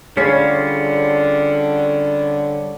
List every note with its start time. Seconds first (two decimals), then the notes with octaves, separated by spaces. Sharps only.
0.17 D3 G3 C#4 F4 G#4 C#5 D5